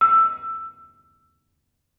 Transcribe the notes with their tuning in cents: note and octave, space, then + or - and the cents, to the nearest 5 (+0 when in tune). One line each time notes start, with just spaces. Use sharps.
E6 +15